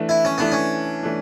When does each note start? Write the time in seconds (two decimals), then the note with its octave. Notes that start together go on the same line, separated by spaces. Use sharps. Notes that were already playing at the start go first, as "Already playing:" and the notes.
Already playing: E3 A3 D4
0.09 E4
0.25 C#4
0.38 E3 A3 B3 D4
0.52 C#4
1.03 E3 A3 D4